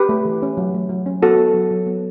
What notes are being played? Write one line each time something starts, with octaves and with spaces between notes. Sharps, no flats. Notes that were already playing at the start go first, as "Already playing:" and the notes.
Already playing: G4 B4
A3
E3
C#4
F#3
A3
F#3
C#4
B3 F#4 A4
B3
F#3
F#3
B3